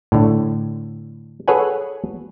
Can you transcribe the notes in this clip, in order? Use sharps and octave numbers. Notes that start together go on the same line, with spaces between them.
A2 D3
G#4 A4 B4 C#5 F#5 G#5